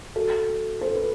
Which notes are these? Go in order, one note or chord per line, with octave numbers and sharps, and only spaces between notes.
F#4 A4
A4 C5
B4